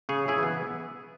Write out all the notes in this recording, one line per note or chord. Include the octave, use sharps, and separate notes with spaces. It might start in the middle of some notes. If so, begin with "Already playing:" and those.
C#3 G#4 C#5
E4 G#4
E3 B3